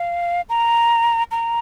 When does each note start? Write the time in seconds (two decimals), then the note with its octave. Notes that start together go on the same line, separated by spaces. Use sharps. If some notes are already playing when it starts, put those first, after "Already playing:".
Already playing: F5
0.49 A#5
1.31 A#5